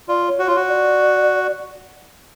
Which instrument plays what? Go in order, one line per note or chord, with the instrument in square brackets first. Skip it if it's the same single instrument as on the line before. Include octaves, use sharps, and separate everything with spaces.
[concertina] F4 [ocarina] D5
[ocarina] C#5
[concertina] F#4
[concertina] F4 [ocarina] C#5
[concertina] F#4
[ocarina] D5